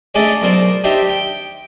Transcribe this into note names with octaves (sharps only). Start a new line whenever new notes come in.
A3 C#4 D4 G#4 D5 D#5
B1 A#4 C5 D5
D4 D#4 G4 C5 E5
G5